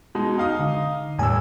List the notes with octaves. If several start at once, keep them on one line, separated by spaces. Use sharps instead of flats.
B2 G#3 D#4
D#4 F5 D#6
D3
D#1 E2 A2 G#5 E6